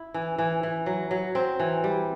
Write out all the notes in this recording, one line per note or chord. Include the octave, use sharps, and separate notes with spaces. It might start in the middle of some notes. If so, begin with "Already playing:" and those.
Already playing: E4
E3
E3
E3
F#3
F#3
C4
E3
G3